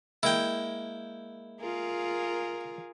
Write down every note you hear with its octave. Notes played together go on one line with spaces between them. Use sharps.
G#3 A#3 E4 G5
F4 G#4 A#4